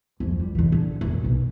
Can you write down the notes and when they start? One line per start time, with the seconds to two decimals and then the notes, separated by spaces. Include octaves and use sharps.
0.20 F2 F3
0.40 G3
0.55 D3 E3
0.72 D3
1.01 F#2 A#2
1.24 B1